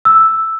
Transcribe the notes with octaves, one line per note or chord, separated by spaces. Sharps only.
E6